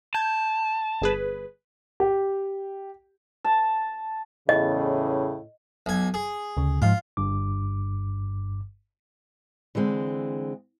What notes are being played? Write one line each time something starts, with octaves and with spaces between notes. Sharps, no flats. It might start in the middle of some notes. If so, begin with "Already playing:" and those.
A5 G6 G#6
G1 G#4 B4
G4
A5
E2 A2 C#3 D#5
B1 G#5
G#4
D2 C#3
G#2 F3 F4
G1 G2 D6
D3 E3 G#3 C4